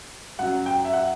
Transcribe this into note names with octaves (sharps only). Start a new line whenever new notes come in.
F#2 F#3 F#5
G5
E5
F#5